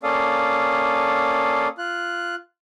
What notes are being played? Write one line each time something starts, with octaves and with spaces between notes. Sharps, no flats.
A#3 C#4 A4 D5 F5 D#6
F4 F#6